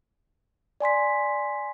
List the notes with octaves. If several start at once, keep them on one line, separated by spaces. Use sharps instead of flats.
D5 G#5 C6 B6